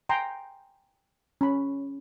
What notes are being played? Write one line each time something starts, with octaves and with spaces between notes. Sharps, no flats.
G5 G#5 A#5 C6
C#4 B5